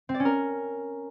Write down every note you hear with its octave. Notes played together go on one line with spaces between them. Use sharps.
C4
D5
C#4
A#4